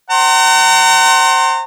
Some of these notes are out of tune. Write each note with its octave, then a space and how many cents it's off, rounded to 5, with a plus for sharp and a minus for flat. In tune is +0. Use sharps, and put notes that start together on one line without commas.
C5 +20 F#5 +40 A#5 -35